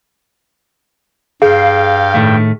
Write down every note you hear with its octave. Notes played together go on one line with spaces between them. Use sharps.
G2 G#4 F5 G5
A2 D#3 A3